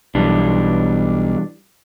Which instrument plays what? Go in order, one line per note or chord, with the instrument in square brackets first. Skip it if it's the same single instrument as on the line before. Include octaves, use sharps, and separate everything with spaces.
[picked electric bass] B1 [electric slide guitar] E3 G3 D4